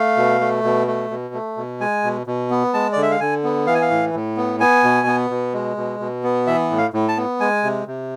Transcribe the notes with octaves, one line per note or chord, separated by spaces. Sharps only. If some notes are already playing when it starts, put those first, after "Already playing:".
Already playing: A3 F5
B2
A3
B2
A3
B2
A3
B2
G#3 G#5
B2
B2
B3
G#3 A5
D3 D5
E5
F5
D3 G#5
B3
E3 F5
G#5
F5
A2
A2
B3
B3 G#5
B2
B3
B2
G#3
B2
B2
B3
E3 E5
A2
F5
A2
A5
B3
G#3 G#5
C3
C3